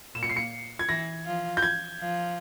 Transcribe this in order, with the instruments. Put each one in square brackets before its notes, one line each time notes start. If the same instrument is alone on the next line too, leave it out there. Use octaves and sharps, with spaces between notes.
[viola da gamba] A#2 A#3 [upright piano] E7
[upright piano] C#7
C7
C#7
G#6
[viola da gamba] E3 E4 [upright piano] A#6
[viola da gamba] F3 F4
[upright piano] G6
G#6
[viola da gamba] F3 F4